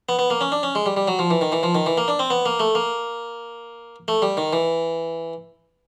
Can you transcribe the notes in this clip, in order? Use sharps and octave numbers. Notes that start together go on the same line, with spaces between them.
B3
B3
A#3
C#4
D4
C#4
G#3
G3
G3
F#3
F3
E3
D#3
E3
F3
D#3
E3
A#3
D4
C4
B3
A#3
A3
A#3
A3
G3
D#3
E3